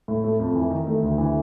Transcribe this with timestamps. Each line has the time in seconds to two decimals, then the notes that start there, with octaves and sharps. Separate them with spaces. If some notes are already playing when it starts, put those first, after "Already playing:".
0.08 A2
0.24 A3
0.40 F2
0.55 E3
0.71 D#3
0.87 A3
1.02 D2
1.18 E3